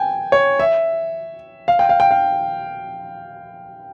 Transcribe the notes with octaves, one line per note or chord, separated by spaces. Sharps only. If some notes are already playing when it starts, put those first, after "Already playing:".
Already playing: G5 G#5
C#5
E5
F5
G5
F5
G5
F5